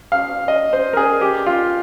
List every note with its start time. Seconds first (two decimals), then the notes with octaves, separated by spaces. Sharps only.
0.12 F5
0.48 D#5
0.73 C5
0.93 A#4
0.97 G#4
1.21 G4
1.46 F4